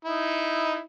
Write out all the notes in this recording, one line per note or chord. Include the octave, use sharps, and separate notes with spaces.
D#4 E4